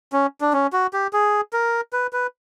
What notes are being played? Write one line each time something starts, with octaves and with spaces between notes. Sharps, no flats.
C#4
D4
C#4
F#4
G4
G#4
A#4
B4
B4